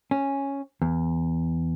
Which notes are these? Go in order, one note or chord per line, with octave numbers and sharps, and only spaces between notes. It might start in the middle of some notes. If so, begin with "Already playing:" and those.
C#4
E2